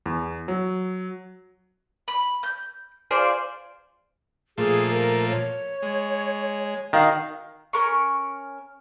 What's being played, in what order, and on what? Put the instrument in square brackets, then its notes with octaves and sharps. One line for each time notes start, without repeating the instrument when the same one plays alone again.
[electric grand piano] E2
F#3
[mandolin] B5
G6
F4 G#4 C5 D5
[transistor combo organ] A#2 F3 A3 [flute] G#4
[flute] A#4
C#5
[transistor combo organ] G#3
[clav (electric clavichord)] D#3 [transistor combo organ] F#4 A#4 [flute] F5
[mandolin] C#4 A#4 C#6